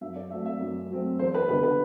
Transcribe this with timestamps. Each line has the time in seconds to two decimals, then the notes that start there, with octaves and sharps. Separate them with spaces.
0.01 F#2 E5
0.16 D5
0.30 F#3 A3 C4 E5
0.45 E5
0.60 F#2
0.90 F#3 A3 C4
1.19 E2 C5
1.35 B4
1.48 D3 G3 B3 B4
1.63 B4